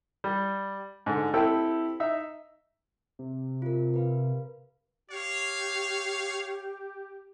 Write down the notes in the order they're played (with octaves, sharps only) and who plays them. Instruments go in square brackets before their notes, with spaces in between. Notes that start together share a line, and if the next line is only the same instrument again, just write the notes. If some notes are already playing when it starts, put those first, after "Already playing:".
[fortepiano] G3
G#2 D3
C4 E4 G4 A4 G5
D#4 E5
[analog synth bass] C3
[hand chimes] F4 A#4
A#4 B4 F5
[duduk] G4 [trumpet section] C#5 F5